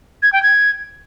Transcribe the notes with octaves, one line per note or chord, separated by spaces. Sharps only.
G#6
G5
G#6